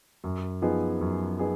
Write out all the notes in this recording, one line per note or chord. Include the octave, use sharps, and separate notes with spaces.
F#2
F3 B3 D#4 G#4
F#2
B3 D#4 G#4